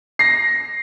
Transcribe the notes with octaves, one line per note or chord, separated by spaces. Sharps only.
A#6 C7